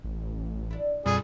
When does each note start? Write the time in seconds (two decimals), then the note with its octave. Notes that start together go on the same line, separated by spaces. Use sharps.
0.04 A1
0.71 D4 E4
1.06 F2 A#2 G3 G#4